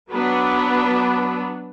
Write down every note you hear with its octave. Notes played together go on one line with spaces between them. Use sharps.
F#3 B3 D4 B4